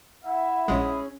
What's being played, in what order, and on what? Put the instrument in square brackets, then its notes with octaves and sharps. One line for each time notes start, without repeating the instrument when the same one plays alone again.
[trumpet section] E4 E5 [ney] F#5
[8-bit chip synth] A#1 G#3 [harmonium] C#4 G#4